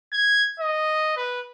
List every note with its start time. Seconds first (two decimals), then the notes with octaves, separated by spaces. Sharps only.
0.13 G#6
0.60 D#5
1.17 B4